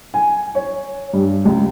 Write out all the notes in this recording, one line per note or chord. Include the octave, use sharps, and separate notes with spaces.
G#5
C#5
G2
C#2